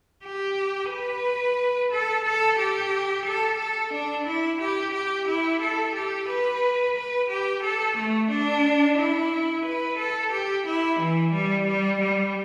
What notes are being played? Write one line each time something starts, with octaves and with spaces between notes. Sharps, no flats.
G4
B4
A4
A4
G4
A4
A4
D4
E4
G4
G4
E4
A4
G4
B4
B4
G4
A4
A3
D4
E4
B4
A4
G4
E4
E3
G3
G3
G3